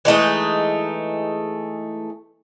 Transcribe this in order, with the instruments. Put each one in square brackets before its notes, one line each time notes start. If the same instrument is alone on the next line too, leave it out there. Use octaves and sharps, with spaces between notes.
[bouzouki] E3 G#3 A3 D#4